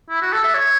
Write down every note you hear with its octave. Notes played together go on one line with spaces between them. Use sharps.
E4
F#4
A4
E5
C#5